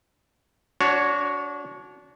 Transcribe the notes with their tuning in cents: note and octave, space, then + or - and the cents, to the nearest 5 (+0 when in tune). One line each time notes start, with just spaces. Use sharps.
D4 -25 F#4 +0 C#5 +0